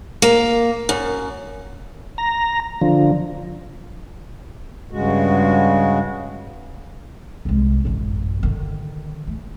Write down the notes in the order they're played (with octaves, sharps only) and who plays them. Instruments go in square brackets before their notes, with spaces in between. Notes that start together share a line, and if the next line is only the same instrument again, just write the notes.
[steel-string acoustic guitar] A#3
F#2
[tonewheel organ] A#5
D3 F3
[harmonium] G2 C#3 G#3 F#4
[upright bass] C2 G#3
A1 F#2
D3 D#3
A3